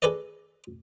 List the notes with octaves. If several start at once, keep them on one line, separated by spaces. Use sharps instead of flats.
G#4 A4 B4 D5 D#5